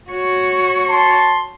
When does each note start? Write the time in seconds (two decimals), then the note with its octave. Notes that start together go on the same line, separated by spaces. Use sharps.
0.11 F#4 C#5
0.89 A5 C6